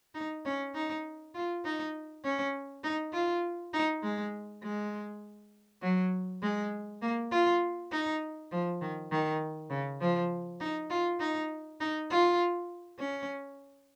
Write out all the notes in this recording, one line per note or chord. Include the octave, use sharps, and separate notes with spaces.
D#4
C#4
D#4
F4
D#4
C#4
D#4
F4
D#4
G#3
G#3
F#3
G#3
A#3
F4
D#4
F3
D#3
D#3
C#3
F3
D#4
F4
D#4
D#4
F4
C#4